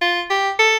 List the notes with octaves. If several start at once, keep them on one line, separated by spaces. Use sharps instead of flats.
F4
G4
A4